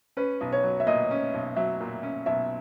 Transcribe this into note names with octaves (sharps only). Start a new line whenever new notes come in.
C#4 B4
B1
C#5
F#3
E5
A#2 D#5
C#4
B1
F#3 E5
A#2
C#4
B1 E5